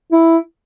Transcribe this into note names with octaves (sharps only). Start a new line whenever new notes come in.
E4